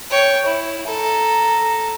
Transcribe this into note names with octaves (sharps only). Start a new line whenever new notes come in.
C#5 G5
E4
A4 A#5